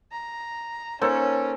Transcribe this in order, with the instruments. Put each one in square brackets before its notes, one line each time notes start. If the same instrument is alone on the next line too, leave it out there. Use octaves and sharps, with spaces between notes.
[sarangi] A#5
[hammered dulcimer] A#3 D#4 A4 [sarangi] C#4 [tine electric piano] C5 C#5